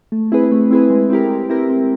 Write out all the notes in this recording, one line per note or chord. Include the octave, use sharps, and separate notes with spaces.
A3
C4 E4 G#4 B4
A3
C4 E4 G#4 B4
G#3
C4 E4 G4 A#4
G#3
C4 E4 G4 A#4
C4